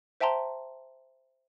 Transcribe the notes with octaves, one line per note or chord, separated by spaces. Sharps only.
C5 E5 G5 A5 A#5 C6